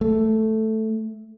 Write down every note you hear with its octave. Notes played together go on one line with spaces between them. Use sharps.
A3